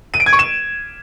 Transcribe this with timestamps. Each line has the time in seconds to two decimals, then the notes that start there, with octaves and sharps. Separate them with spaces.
0.14 D#7
0.20 D7
0.26 G#6
0.33 C#6
0.39 E7